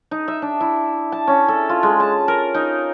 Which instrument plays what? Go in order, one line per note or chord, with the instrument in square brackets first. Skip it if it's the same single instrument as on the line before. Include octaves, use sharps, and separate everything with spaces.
[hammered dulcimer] D#4
E5
D4
E4
A5
C#4
A4
F4
G#3
A5
A#4
D#4